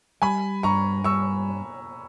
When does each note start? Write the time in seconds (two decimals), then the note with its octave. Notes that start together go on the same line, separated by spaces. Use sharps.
0.22 G3 G#5 B5
0.63 G2 A#5 C#6
1.04 G3 C#6 E6